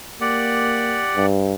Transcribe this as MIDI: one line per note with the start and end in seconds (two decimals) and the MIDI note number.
0.21 1.02 58
0.21 1.26 67
0.21 1.26 74
0.21 1.26 78
1.16 1.55 43